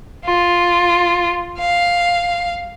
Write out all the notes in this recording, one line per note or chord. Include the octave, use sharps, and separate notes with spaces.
F4
F5